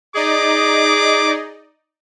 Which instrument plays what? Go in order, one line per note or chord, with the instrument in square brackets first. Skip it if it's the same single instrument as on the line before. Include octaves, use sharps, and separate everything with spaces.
[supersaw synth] D#4 D5 D#5 [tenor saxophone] G#4 [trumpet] D6